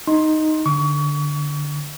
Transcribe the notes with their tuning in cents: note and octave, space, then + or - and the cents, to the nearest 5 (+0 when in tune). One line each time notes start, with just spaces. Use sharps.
D#4 +0 C6 +15
D3 +0 C#6 +35